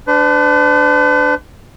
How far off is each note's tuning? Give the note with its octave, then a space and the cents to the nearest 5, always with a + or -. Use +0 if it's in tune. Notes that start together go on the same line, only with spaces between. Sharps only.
D4 +0 B4 +45